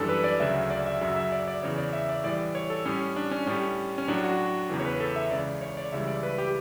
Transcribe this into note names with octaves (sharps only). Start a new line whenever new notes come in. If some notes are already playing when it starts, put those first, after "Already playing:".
Already playing: F#2 E3 G3 D4 A4
B4
D5
D2 C#3 F#3 E5
D5
E5
F#2 C#3 F#3 E5
E5
D5
D5
E2 C#3 E3 C#5
D5
E5
D5
A2 E3 G3 D5
C#5
A4
A2 G3 C#4
D4
C#4
A2 G3 C#4
C#4
A2 F#3 D4
F#4
E2 C#3 E3
C#5
B4
A4
E5
C#2 C#3 E3 D5
C#5
D5
C#2 C#3 E3 G3 E5
D5
B4
G4